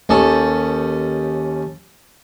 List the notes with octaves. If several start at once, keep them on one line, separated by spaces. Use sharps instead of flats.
D#2 C#4 A4